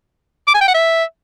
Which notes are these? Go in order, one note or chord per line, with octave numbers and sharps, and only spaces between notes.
D6
G#5
G5
F#5
E5